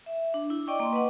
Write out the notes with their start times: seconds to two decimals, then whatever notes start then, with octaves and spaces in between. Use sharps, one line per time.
0.06 E5
0.34 D4
0.50 E4
0.67 D5 D#5 G5 C#6 D6
0.80 A#3 C6
0.93 B4 D#5 F#5